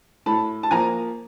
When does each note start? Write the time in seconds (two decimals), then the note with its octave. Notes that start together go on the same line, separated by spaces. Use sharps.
0.26 A2 A5 B5
0.63 A5
0.71 F3 A#3 G#5 A#5